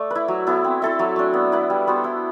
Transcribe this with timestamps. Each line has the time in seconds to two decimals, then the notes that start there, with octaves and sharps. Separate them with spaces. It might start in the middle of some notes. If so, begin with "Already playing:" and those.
Already playing: A3 D5
0.10 E4 B4
0.28 F#3
0.47 B3 E4 A4
0.64 C4
0.82 E4 A4 E5
0.99 F#3
1.16 A3 D4
1.34 B3
1.52 E4 B4
1.70 G3
1.87 B3 F#4 C5
2.04 E4